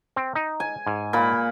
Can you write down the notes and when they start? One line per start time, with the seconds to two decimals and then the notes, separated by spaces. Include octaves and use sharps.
0.16 C4
0.35 D#4
0.60 G#5
0.87 G#2
1.13 A#2 B5